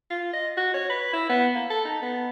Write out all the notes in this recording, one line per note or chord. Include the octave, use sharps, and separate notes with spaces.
F4
D#5
F#4
C#5
B4
E4
B3
A#3
A4
D#4
B3